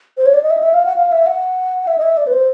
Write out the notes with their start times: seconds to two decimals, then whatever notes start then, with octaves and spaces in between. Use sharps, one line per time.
0.18 C5
0.26 C#5
0.34 D5
0.43 D#5
0.50 E5
0.58 D#5
0.63 E5
0.74 F5
0.86 F#5
0.96 F5
1.12 E5
1.26 F#5
1.87 E5
1.98 D#5
2.03 E5
2.17 D5
2.27 B4
2.33 C5